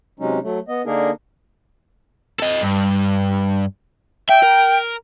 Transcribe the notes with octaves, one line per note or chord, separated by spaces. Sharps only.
C3 F#3 G#3 C#4 D#4
F#3 A3
B3 D#5
D3 A#3 D4 D#4 G#4 A#4
A4 D#5
G2
E5 G5
A#4